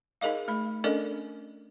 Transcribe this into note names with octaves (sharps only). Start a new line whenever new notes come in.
D#4 G#4 A#4 D#5 F5
A3 B5
C#4 D4 A4 A#4 D5 D#5